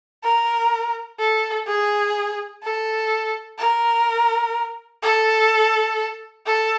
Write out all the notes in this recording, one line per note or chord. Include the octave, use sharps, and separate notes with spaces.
A#4
A4
G#4
A4
A#4
A4
A4